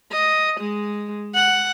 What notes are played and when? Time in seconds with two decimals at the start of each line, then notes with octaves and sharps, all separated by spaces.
0.12 D#5
0.60 G#3
1.35 F#5